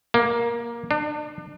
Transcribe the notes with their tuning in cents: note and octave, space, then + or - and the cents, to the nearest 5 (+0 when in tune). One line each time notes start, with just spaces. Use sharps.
A#3 +15
D4 +35